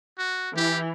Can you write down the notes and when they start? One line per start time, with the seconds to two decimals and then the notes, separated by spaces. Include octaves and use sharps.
0.18 F#4
0.56 E3 G4